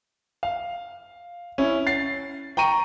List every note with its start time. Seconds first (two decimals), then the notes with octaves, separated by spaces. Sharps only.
0.43 F5
1.58 C#4 E4
1.87 A6 C7
2.57 G5 A#5 C#6 D#7